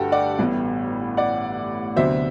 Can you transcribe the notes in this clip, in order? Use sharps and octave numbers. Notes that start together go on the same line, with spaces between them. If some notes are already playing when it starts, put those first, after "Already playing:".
Already playing: G1 G2 A3 F#4 G4 A4
D5 F#5
A1 A2 G3 B3
D5 F#5
D2 C3 F#3 B3 C5 E5